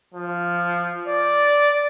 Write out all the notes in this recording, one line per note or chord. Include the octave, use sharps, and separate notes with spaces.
F3
D5